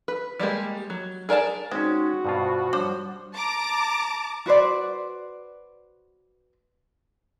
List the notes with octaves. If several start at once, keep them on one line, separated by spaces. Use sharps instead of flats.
B4
G3 G#3 A#3 G4
F#3
G#4 A#4 D5 G5 A5
G#3 C4 C#4 D#4 F#4
G2 B2 F4 C5
F3 G3 D4 C5 C#5
A5 A#5 D6
F#4 B4 C5 D5